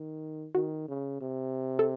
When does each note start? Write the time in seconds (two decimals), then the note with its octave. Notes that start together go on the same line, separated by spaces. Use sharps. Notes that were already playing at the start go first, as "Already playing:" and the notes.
Already playing: D#3
0.54 D#3 F#4
0.88 C#3
1.21 C3
1.79 A4